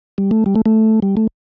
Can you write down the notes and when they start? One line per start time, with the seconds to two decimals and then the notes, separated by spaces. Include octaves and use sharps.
0.18 G3
0.31 A3
0.46 G3
0.56 A3
0.66 A3
1.02 G3
1.17 A3